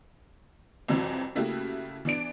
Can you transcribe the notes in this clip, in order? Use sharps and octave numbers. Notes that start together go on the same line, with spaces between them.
C2 F2 C3 E3 F#3
C#3 A3 A#3 E4 F#4 G4
E3 B3 D4 D5 D7